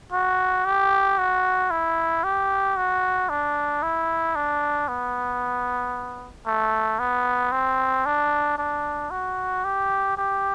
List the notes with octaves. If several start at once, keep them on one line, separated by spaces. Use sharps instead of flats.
F#4
G4
F#4
E4
G4
F#4
D4
E4
D4
B3
A3
B3
C4
D4
D4
F#4
G4
G4